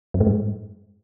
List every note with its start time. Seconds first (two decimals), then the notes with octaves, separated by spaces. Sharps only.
0.14 F#2
0.20 A2
0.27 G#2